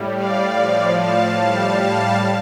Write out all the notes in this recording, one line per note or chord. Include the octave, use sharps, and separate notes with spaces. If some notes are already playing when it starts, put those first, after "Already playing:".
Already playing: A2 G3
D5 F5
A2 F3
F5 A5
A2 G3 F5 A5
F5 A5